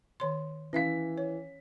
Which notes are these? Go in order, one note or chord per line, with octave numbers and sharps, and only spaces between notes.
D#3 C#5 C6
E3 C#4 E5 F5 B6
C#5